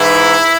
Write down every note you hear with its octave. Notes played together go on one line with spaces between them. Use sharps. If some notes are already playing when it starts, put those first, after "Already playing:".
Already playing: G#2 E3 E4